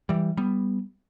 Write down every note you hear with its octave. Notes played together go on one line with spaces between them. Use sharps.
E3 G3
G3 B3